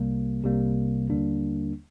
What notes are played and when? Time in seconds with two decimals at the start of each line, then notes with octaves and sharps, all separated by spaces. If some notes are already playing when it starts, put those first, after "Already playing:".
Already playing: C2 C3 G3 A#3
0.43 C2 C3 G3 A#3
1.09 D#2 D3 G3 A#3 D4